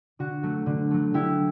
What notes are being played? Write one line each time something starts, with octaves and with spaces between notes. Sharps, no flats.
D3 F#4
F#3 A3
D3
F#3 A3
D3 E4 G4